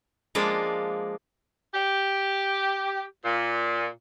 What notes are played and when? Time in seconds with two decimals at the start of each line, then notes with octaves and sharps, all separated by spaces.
0.35 F3 G#3 A#3 D4
1.74 G4
3.25 A#2